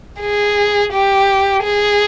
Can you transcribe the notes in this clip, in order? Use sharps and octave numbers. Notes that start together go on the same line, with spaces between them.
G#4
G4
G#4